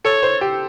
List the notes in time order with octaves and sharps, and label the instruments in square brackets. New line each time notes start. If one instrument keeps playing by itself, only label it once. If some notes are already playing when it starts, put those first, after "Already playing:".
[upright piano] A4 [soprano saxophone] C#5
[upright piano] C5
G4